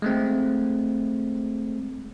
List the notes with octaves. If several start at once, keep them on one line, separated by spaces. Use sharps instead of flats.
G#3 A3 C4